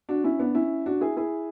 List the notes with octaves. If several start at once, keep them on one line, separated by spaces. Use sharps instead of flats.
D4 F#4
C#4 E4
B3 D4
C#4 E4
D4 F#4
E4 G#4
E4 G#4